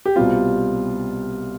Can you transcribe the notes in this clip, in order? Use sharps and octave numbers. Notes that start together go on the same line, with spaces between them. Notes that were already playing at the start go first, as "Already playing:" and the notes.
G4
C2 B2 G3 C4 F4